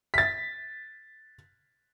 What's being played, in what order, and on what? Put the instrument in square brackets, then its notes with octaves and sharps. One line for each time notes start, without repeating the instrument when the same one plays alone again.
[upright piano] A6 B6